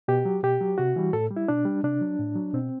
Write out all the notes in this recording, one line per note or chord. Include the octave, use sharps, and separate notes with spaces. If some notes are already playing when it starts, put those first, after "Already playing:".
B2 G4
F#3
B2 G4
F#3
C3 F#4
E3 G3
A2 A4
G3
E4
B2 D4
G3
C3 D4
F#3
A2
F#3
B2 C4